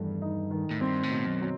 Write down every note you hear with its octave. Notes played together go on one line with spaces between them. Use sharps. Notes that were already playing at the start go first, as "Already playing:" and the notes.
Already playing: E2 G2 D#3 A3
D#4
D#3
A2
G2 C4
A2
B2
F#2
F#3